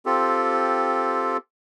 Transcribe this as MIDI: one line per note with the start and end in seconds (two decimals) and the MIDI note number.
0.06 1.37 60
0.06 1.37 65
0.06 1.37 67
0.06 1.37 69